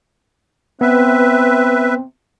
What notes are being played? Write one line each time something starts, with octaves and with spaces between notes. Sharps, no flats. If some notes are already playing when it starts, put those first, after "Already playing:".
B3 C4 B4 E5